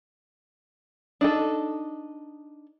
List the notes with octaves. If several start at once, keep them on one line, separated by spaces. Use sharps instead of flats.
D4 D#4 A4